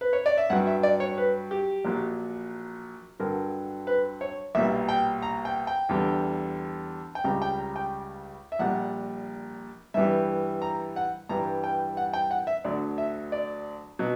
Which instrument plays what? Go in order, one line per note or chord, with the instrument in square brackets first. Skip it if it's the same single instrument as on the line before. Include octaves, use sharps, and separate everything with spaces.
[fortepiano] B4
C#5
D5
E5
G2 F#3 F#5
E5
D5
C#5
B4
G4
A#1 A#2 F#3
G2 D3 F#3 A#4
B4
C#5
B1 A#2 G3 E5
G5
A#5
G5
G5
E2 D3 G3
G5
C#2 C#3 G3 A#5
G5
A#5
G5
E5
A#1 A#2 G3 F#5
G2 E3 G3 E5
A#5
F#5
G2 E3 G3 A#5
G5
F#5
G5
F#5
E5
D2 D3 F#3 D5
E5
D5
B2 F#3